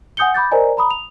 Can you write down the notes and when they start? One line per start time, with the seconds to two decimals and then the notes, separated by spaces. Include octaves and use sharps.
0.17 F#5 G#5 D#6 G6 C#7 G7
0.34 B5 D6 G6 A6
0.51 A#4 C5 D5 D#5 G#5 A#5
0.77 A#5 B5 D#6
0.91 F7